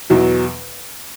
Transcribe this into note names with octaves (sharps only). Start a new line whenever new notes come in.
E2 B2 F#3